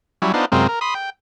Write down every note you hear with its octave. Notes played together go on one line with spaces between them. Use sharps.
F#3 G3 C#4 E4
B3 D4 D#4 F4 C5
F#2 C3 G#3 C4 F4 A#4
A#4
B5 C6 D#6
G5